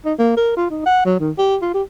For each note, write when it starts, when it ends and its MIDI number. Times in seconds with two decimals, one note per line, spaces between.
0.05 0.13 63
0.19 0.34 58
0.37 0.53 70
0.57 0.66 65
0.70 0.81 63
0.86 1.04 78
1.05 1.15 54
1.20 1.31 51
1.38 1.57 67
1.61 1.73 65
1.74 1.82 67